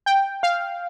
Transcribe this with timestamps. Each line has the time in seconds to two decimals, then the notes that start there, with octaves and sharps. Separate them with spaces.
0.06 G5
0.43 F5